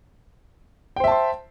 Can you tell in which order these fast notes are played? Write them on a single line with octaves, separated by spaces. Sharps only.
G5 C5 E5 A5 C6